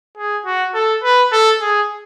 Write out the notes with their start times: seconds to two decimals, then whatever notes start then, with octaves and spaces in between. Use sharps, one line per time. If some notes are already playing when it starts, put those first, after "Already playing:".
0.17 G#4
0.45 F#4
0.74 A4
1.03 B4
1.32 A4
1.61 G#4